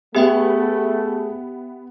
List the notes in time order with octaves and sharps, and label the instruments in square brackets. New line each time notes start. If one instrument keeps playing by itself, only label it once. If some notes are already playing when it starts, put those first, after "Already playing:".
[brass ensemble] A3 [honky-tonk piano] B3 [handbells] G4 E5 G5 [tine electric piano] G#4